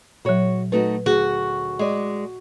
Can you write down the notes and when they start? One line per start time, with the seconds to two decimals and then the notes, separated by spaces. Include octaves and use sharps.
0.25 A#2 F#3 F#4 C#5
0.72 A3 D#4 F#4 B4
1.06 D2 F#4 G#4
1.79 G#3 D5 D#5